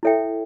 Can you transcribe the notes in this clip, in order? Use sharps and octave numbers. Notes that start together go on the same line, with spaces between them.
E4 A4 C#5 E5 G5